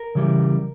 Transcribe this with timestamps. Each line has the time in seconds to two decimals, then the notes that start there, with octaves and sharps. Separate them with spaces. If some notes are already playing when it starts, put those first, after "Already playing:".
Already playing: A#4
0.15 C#3 E3 G3